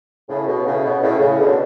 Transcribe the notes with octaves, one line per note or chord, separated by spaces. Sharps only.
A2 C#3
B2
A2 C#3
B2
A2 C#3
A2 C#3
B2 D3